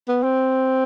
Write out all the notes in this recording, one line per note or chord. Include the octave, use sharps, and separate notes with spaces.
B3
C4